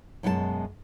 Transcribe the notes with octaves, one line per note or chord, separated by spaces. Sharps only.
F#2 B2 G#3 A4 A5